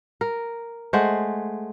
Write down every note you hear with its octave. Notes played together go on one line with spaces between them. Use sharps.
A#4
G#3 A3 C5 F#5